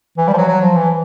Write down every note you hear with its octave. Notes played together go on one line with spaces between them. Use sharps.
E3
G3
F3
F#3
F#3
F3
E3